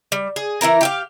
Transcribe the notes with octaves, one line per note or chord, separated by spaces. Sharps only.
G3
G#4
E3 E4 A#4 A#5
G4 E5 F5